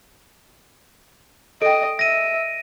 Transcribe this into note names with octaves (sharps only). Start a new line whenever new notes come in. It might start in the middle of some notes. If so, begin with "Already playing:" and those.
A4 D#5 G5 D7
E5 A#6 D#7